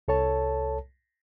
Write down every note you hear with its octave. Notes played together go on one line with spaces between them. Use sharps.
C2 A4 C#5 A5